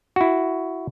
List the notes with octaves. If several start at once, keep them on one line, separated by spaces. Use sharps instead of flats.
E4 F#4